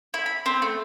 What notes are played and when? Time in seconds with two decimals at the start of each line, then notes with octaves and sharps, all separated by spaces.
0.14 E4
0.26 B5
0.46 C4
0.62 A3